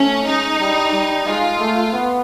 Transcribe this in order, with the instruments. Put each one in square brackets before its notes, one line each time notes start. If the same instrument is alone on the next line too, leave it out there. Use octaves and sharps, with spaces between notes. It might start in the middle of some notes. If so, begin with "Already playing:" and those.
Already playing: [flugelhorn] A3 [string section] C#4
[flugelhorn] G#3 [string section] D#4
[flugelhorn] G3
G3
[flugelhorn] G#3 [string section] F4
[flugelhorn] A3
B3